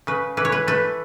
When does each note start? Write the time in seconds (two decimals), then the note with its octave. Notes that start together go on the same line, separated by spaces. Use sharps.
0.07 C#3 B4
0.37 E3 B4
0.45 C#5
0.52 B4
0.68 A3 B4